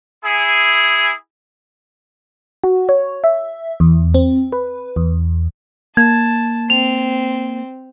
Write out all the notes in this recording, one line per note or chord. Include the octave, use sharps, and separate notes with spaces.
E4 G#4
F#4
C#5
E5
E2
C4
B4
E2
A#3 A5 G#6
C4 F7